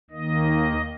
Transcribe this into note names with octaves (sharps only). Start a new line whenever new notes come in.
D#2 D#3 A#3 D#5